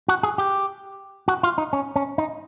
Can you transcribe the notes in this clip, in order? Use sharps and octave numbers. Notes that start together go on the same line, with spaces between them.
F#4
G#4
G4
F#4
F4
D#4
C#4
C#4
D#4